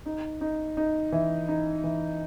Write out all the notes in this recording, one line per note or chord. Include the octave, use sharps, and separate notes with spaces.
D#4
D#4
D#4
E3
D#4
E3